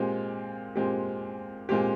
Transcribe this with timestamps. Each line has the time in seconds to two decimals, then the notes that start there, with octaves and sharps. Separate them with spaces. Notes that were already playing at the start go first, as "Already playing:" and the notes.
Already playing: A#2 G#3 C4 G4
0.76 A#2 G#3 C4 G4
1.69 A#2 G#3 C4 G4